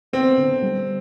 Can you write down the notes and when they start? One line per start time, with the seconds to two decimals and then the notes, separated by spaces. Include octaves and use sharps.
0.13 B3 C4
0.38 D3
0.62 G3